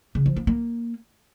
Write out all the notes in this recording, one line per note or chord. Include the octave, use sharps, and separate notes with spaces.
C#3
F3
A#3
A#3